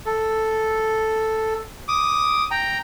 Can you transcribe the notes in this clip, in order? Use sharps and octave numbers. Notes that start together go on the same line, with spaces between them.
A4
D6 D#6
G5 A#5